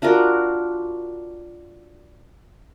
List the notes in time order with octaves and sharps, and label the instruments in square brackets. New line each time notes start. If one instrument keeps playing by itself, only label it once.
[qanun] D4 F4 F#4 A#4